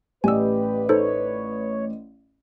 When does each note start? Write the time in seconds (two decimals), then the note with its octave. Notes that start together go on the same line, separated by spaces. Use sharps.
0.24 A1 G4 B4 D5 D#5 G#5 E6
0.89 D#4 A4 C5 C#5